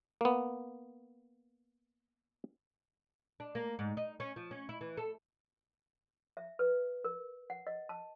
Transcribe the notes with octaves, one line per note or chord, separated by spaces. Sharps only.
A#3 B3
D4
A#3
G#2
D#4
C#4
F3
C#4
E4
E3
A4
E5
B4
A#4
F#5
D#5
A5